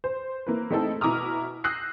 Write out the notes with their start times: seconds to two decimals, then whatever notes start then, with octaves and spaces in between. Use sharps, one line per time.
0.04 C5
0.47 A#3 E4 B4
0.71 A3 C4 D#4 E4 A4
1.01 B2 E4 A#5 D6 D#6 F6
1.64 D#6 E6 F#6 G6 A#6 C7